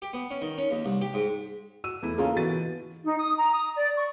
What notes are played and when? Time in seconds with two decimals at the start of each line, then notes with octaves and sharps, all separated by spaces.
0.02 G4
0.13 B3
0.31 C#4
0.42 D#3
0.58 C#4
0.71 D#2
0.85 C2
1.02 G4
1.14 G#2
1.84 F#4 E6 D#7
2.02 E2 A3 E4
2.18 C#3 A#3 F4 A4
2.36 B2 E3 A6 D#7
3.04 D#4
3.18 D#6
3.37 A#5
3.53 D#6
3.76 D5
3.97 C#6